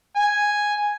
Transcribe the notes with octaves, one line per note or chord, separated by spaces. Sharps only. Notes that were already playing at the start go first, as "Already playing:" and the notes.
G#5